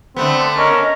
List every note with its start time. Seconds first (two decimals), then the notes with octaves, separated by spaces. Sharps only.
0.16 D3 A3 B3 C4
0.58 C#4 A#4 D#5